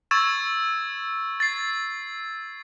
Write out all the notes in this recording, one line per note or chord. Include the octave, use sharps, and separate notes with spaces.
C#6 E6 G#6 A6 E7
A6 C7